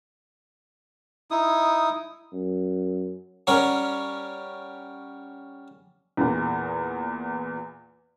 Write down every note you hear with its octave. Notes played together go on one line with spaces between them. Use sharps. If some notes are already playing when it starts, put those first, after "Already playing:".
D#4 E4 D#6
F#2
G3 C#4 A#4 C#5 F#5
E2 A#2